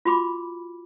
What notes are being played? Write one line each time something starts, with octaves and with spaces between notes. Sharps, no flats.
F4 F#4 B5 D6